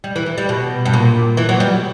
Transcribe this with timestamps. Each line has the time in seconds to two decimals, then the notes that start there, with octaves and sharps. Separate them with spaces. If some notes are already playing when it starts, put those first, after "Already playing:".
0.04 G3
0.16 E3
0.26 E3
0.38 G3
0.49 B2
0.86 G2
0.93 A#2
1.37 E3
1.49 F#3
1.60 G3